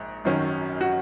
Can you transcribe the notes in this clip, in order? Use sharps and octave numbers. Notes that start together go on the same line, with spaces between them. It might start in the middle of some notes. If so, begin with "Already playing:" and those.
Already playing: A#1 G#2
G#1 F#2 D#3 F#3 C#4
F#4